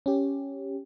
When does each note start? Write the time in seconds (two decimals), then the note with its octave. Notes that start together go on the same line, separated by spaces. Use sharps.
0.06 C#4 G4